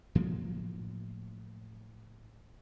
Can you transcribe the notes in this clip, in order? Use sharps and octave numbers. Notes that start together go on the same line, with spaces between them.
A2 F3 F#3 A#3